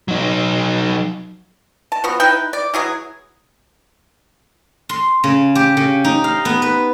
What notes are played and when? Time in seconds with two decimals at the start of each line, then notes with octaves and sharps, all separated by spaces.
0.08 F#3 D#4
1.92 A5
2.04 F3 B3 F#4
2.20 D#4 E4 B4 G5
2.53 D5
2.74 E3 F#3 G#4
4.89 C6
5.24 C#3
5.55 G4
5.77 C#3
6.04 D#4
6.24 F5
6.45 B3
6.62 B4